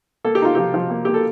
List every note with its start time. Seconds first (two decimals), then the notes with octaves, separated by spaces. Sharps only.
0.25 A#3 A4
0.35 G4
0.42 D#4 F4
0.55 F3 G4
0.74 F3
0.90 A#3
1.05 A#3 G4
1.14 A4